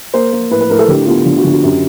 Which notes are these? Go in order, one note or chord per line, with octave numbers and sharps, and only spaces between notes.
A#3 C5
A#3
A2 B4
B4
A2 A#4
A4
D3 G4
B3 F4
D3
F#4
D3
F#4
F#2 G4